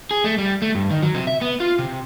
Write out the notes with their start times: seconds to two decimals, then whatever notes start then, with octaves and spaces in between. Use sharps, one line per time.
0.11 G#4
0.24 A3
0.38 G3
0.62 A3
0.75 G2
0.91 D#3
1.03 F#3
1.15 C3
1.27 E5
1.42 B3
1.60 F4
1.79 C3